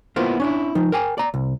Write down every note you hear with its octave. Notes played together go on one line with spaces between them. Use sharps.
A#3 B3 E4 F4 A#4 C5
C#4 D4 E4
F3 D#4
A#4 G5 G#5
D5 A#5
C2